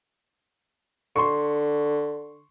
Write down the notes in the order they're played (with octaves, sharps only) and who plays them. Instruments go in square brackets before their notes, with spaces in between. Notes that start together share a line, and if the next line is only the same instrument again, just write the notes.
[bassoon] D3 [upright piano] C6 C#6